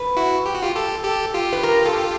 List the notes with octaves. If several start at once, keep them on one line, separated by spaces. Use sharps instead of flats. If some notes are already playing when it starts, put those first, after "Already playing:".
Already playing: B4
E4 F#4
G4
F#4
F4 G4
G4 A4
G4 A4
F4 G4
B4
A#4
A4